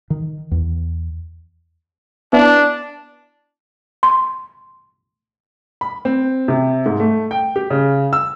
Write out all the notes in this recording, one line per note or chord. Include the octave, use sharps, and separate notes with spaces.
D#3
E2
B3 D4 E4
C6
B5
C4
C3
G#2
A3
G5
G4
C#3
E6